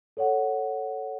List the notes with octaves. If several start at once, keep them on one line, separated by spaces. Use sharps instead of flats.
A4 C#5 F#5